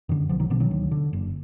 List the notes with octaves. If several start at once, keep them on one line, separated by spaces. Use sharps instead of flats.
F#2 D3 D#3
B1 D3 F3
D#3 F#3
B2 D3 F3
D#3 F#3
D2
D3
F#1